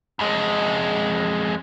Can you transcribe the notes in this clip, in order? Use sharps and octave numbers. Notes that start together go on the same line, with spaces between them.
F2 G#3